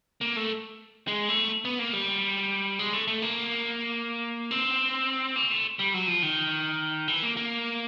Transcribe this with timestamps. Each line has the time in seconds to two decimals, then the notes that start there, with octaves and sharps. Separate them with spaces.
0.21 A#3
0.36 A3
1.07 G#3
1.29 A3
1.65 B3
1.79 A#3
1.93 G3
2.79 G#3
2.93 A3
3.07 A3
3.22 A#3
4.51 C4
5.36 A#3
5.51 A3
5.79 G3
5.94 F#3
6.07 F3
6.22 D#3
7.08 E3
7.23 A#3
7.37 A#3